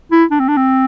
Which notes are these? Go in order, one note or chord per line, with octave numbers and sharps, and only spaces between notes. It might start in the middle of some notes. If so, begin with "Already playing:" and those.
E4
D4
C4
D4
C4